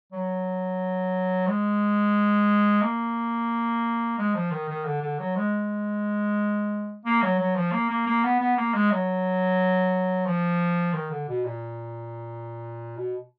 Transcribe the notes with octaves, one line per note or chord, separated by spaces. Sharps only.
F#3
G#3
A#3
G#3
F3
D#3
D#3
D3
D3
F#3
G#3
A#3
F#3
F#3
F3
A#3
A#3
A#3
B3
B3
A#3
G#3
F#3
F3
D#3
D3
B2
A#2
B2